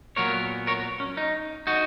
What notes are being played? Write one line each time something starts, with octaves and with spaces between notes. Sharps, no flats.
A#2 F#3 B3 A#4 C#5
A#4 C#5
C#4
D#4
D#4 F#4